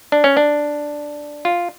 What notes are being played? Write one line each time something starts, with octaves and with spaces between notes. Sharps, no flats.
D4
C#4
D4
F4